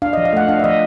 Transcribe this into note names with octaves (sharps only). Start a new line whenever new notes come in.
D4 F5
F3 D#5
F5
A3 F#5
D4 F5
E5
F3 D#5